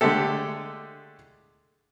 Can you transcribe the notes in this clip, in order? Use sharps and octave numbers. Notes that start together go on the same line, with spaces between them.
D3 G#3 A3 G4 A4